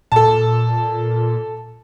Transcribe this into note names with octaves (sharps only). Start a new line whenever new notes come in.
A#2 A4 A5